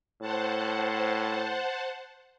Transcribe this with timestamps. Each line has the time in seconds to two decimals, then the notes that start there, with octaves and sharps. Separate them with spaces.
0.21 A2 C5 F#5 A5